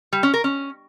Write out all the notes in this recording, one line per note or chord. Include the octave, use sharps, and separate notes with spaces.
G3
C#4
A#4
C#4